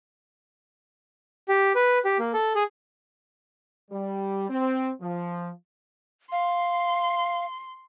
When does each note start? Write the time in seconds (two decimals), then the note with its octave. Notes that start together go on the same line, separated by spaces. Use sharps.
1.48 G4
1.75 B4
2.05 G4
2.19 A#3
2.33 A4
2.55 G#4
3.91 G3
4.50 C4
5.01 F3
6.32 F5 C6